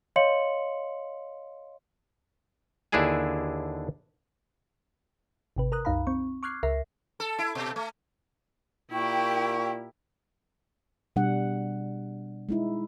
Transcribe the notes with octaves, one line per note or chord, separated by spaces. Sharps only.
C#5 D#5 F5 C6 C#7 F#7
D#2 D3 D4 E4 G#4 G#5
G#1 C3 B4
A#4 A#5 D#6 F#6
C2 F#2 D#4 F5 A#5 B5
C4 C#6
C#6 D6 F6 F#6 G#6 C7
C#2 A#4 E5 A#6 C7
A4
E4
B2
A3
A#2 E4 G4 A#4 G5 C#6
B2 G3 D4 F#5
G#3 D#4 E4